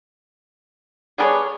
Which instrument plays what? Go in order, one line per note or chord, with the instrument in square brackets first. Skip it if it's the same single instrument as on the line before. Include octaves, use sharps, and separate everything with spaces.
[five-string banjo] G3 B3 D4 [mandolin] G#4 A#4 C#5